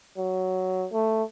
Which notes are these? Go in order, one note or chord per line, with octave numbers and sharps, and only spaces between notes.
F#3
A3